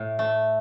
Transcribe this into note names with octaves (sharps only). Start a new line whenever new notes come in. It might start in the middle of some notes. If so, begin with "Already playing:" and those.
Already playing: A2
A3